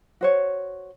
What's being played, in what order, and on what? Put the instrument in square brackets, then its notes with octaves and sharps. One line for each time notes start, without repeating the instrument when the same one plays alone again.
[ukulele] F#4 C5 C#5